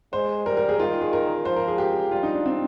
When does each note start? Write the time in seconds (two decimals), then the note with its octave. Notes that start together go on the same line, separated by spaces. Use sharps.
0.13 G#3 C5
0.45 G3 A#4
0.57 A#4
0.69 G#4
0.79 D#3 F4
1.01 G#4
1.13 A#4
1.45 F3 C5
1.56 A#4
1.68 G#4
1.78 G4
2.11 G3 F4
2.23 D#4
2.33 D4
2.46 C4